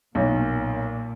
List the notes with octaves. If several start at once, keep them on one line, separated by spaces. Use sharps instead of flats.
B1 A#2